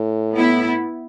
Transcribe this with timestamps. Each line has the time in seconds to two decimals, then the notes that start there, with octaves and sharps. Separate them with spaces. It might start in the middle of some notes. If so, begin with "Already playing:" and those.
Already playing: A2
0.36 B3 E4